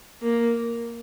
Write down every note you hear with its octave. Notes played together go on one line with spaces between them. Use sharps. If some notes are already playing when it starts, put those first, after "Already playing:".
A#3